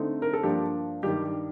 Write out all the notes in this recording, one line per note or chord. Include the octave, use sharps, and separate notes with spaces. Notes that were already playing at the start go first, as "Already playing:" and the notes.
Already playing: D3 A3 C4 D#4
A#4
A4
G2 F3 A#3 D4 G4
G2 D#3 G3 G4